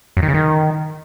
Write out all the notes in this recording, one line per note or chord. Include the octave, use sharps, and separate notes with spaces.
F#2
D#3
C#3
D#3